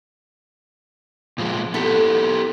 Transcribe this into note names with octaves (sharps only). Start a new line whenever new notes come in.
A#2 F3 G#3
B3 E4 G4 A4